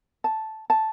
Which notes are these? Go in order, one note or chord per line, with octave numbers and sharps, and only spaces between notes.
A5
A5